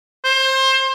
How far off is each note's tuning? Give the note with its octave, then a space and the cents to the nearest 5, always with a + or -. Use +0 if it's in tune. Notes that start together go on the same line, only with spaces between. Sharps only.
C5 +25